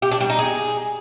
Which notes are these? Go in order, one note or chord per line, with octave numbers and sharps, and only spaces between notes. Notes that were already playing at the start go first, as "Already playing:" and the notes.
G4
D4
G3
D#4
G#4